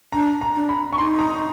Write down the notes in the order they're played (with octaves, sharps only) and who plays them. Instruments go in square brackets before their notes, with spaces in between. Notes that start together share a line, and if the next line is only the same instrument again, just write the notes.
[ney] D4 [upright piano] A#5
[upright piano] A#5
[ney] D4
[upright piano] B5
C#6
[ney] D#4 [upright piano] C6
[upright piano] A#5